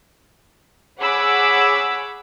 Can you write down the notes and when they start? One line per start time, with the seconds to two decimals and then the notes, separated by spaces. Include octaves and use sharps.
1.00 G#4 C#5 F#5 B5 D6 E6